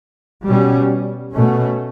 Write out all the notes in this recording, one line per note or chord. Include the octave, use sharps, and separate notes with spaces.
B2 G3 C#4
B2 A3 C#4